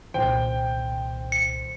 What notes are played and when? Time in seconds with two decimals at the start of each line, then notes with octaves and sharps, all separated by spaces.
0.14 C2 A#2 D#3 C5 G5
1.32 C#7